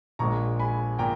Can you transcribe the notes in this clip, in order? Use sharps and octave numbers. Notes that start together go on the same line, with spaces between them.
A#1 A#2 G#3 A#5 C#6
G#5 B5
A#2 G5 A#5